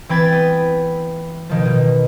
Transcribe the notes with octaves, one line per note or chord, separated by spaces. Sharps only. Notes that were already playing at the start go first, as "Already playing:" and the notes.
E3 C4 G5 B5 G#6 A6
B3
B2 D#3 F3
B2